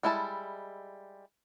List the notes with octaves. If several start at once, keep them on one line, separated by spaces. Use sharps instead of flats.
G3 G#3 E4 A4 A5